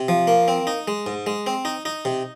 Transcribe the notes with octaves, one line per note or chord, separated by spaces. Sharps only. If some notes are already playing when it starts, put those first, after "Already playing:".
Already playing: C3
F3
A#3
C4
D#4
G#3
G#2
G#3
C4
D#4
D#4
C3